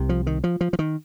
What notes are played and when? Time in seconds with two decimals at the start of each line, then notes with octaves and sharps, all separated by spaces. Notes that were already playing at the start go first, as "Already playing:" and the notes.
Already playing: C2 C3
0.09 F3
0.27 D#3
0.44 F3
0.61 F3
0.73 F3
0.79 D#3